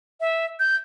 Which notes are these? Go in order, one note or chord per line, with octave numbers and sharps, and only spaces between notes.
E5
G6